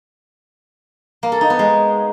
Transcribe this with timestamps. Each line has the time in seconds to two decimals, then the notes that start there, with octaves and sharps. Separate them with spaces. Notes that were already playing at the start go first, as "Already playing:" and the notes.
1.23 A#3
1.32 A4
1.41 D#4
1.50 B3
1.59 G#3